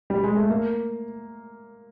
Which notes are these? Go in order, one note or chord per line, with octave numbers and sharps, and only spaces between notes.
G3
G#3
A3
A#3